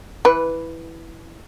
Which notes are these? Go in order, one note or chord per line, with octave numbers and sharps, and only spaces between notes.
E3 B4